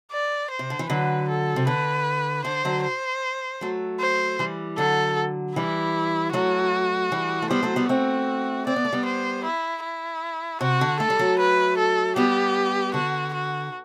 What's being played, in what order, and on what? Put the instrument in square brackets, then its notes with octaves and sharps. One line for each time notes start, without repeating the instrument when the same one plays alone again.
[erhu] D5
C5
[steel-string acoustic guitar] C3
D3
E3
[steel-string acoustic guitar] D3 F#3 [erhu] B4
[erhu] A4
[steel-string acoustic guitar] C3
[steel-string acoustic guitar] D3 [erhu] B4
[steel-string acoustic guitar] D3 [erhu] C5
[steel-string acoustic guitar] D3 F#3
[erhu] C5
[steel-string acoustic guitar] F#3 A3
[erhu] C5
[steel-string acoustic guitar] E3 G3
[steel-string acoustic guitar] D3 F#3 [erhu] A4
[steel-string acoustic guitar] E3 G3 [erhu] E4
[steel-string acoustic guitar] F#3 A3 [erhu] F#4
[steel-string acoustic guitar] E3 G3
A3
[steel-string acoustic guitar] G3 B3 [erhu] C5
[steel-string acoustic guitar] F#3 A3
G3 B3
[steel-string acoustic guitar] A3 C4 [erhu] F#4
[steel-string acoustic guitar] C4 [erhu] D5
[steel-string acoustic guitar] B3
A3
G3 B3
[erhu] C5
E4
E4
[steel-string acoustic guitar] C3 [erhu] F#4
[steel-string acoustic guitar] D3
[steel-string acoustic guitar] A3 [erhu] A4
[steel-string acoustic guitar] G3
F#3 A3
[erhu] B4
A4
[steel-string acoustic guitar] G3 B3 [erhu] G4
[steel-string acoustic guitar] D3 [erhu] F#4
[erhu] F#4